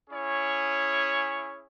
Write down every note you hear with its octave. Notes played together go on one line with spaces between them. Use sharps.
C#4 E4 G#4 C#5